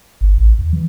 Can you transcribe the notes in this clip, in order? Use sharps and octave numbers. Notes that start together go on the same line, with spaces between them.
G1
A1
D#2
E3